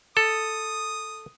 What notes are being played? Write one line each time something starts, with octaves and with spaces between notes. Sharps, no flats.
A4 D#6